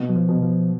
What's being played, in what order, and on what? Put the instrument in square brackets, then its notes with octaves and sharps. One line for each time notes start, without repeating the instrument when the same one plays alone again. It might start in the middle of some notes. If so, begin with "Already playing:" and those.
Already playing: [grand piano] B2
[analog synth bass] F#3
F3
[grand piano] B2
[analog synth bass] F3